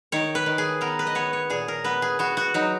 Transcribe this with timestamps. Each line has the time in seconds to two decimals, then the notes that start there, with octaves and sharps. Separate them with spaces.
0.12 D#3 C#5
0.35 B4
0.46 D#3
0.58 G#4
0.81 B3 A#4
0.99 B4
1.07 D#5
1.15 B3 C#5
1.33 C#5
1.50 A#2 G#4
1.68 A#4
1.84 B3 B4
2.02 G#4
2.19 B3 F#4
2.37 F#4
2.54 F#3 D#4